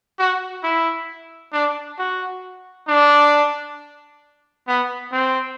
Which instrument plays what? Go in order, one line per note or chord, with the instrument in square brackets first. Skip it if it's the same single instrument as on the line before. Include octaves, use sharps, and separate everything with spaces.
[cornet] F#4
E4
D4
F#4
D4
B3
C4